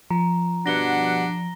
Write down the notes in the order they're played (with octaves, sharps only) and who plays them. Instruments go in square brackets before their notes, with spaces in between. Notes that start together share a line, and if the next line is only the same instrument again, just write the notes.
[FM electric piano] F3 [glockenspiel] A#5
[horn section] G2 B2 F#5 [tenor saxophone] D4 [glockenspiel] A#6 G7